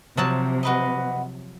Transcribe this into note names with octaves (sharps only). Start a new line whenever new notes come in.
C3 F3 F#3 A5
F#4 B4 D#5